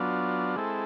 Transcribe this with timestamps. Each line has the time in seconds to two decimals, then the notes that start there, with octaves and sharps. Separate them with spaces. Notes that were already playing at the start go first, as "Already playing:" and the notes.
Already playing: F#3 B3 D4 F4
0.56 G#3 C4 E4 A4